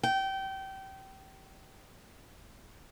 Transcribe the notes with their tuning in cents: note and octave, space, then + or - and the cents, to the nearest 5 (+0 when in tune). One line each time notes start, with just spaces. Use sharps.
G5 -25